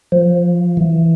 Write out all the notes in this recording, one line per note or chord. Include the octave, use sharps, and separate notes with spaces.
F3
E3